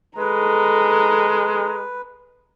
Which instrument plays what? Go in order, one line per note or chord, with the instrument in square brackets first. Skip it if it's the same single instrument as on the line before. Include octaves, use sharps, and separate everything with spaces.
[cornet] G#3 [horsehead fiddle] A4 A#5 [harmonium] B4